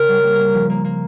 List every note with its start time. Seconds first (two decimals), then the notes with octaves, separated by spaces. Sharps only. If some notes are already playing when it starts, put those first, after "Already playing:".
Already playing: C#3 A#4
0.08 G3
0.24 A#3
0.39 A#3
0.54 F3
0.70 A#3
0.85 A#3